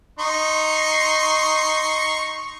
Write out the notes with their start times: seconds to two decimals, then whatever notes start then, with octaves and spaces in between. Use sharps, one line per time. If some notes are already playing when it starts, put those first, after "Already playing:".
0.19 D#4 C6 C#6